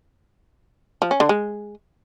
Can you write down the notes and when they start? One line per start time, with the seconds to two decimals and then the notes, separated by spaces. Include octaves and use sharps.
1.02 F3
1.11 C#4
1.20 D3
1.29 G#3